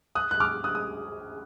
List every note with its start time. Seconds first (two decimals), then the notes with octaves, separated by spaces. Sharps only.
0.15 D#6 F#6
0.31 F#6
0.40 D6 F6
0.64 D#6 F#6
0.75 D#6